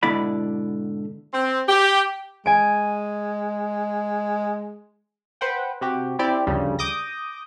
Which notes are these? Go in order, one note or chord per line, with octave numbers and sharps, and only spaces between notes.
G#2 B2 D3 E4 D5 B5
C4
G4
G#3 G#5 D7
B4 C5 F#5 G5
C3 F#4 G4
C4 E4 G4 D5
D2 G2 C#3 F3 G3
D6 D#6 G6 A#6